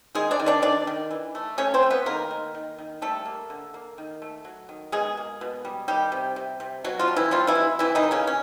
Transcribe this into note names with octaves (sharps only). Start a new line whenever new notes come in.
D#3 G#3 G#4
D4 D5
D#3
D4 D5
D#3 D4 D5
D#3
E3
A3
A3 C#4 C#5
C4 C5
A3
B3 B4
D#3 A#3 A#4
D#3
D#3
D#3
G3 A3 A4
A#3
D3
A#3
D#3
A3
F#3
D#3
B2 G#3 G#4
A#3
B2
G3
D#3 G3 G4
C3
C3
C3
B2 F#3 F#4
F3 F4
G3
E3 E4
F3 G3 F4
E3 E4
B2
C3 E3 E4
D#3 D#4
E3
C#3 C#4
C#4